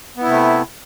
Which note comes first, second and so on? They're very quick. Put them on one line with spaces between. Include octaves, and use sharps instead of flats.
B3 E4 C3 A3